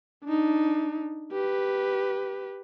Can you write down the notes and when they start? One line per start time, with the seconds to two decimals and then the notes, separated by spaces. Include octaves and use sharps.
0.25 D4 D#4
1.32 G4 B4